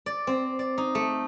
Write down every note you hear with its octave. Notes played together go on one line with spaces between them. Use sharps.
D5
C4
D5
D#4
A3